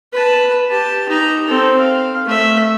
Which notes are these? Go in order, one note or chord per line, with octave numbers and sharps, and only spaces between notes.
B4 A5
G4 A5
D#4 A#5
C4 A4
F5
A3 E5